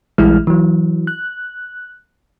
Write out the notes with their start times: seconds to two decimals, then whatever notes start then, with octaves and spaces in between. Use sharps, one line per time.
0.18 A#1 E3 G3 G#3 E4 F6
0.47 E3 F#3
1.07 F#6